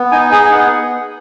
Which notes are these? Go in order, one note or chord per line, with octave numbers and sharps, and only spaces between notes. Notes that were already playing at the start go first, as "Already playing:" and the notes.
Already playing: B3
D#4 G#5
G#4 G#5
B3 F#5